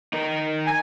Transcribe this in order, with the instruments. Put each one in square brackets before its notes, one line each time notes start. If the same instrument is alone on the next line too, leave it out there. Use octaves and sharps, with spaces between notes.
[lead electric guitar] D#4 A#4
[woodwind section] G#5